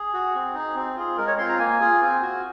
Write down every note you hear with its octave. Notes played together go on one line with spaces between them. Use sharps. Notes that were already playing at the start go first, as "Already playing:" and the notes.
Already playing: G#4
F#4
C4
D#4 G#4
C4
F4 G#4
G#3 A#4
C#5
C4 F4 C6
A#5
A#3 G#5
F4 G#4
C4
F#4